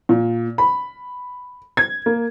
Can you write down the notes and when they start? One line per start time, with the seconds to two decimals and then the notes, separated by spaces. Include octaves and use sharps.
0.09 A#2
0.58 B5
1.77 G#6
2.06 A#3